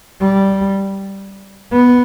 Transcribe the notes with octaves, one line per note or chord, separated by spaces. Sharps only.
G3
B3